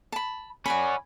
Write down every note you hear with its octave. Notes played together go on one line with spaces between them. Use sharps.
A5 B5
C#4 F#4 D5 G#5 B5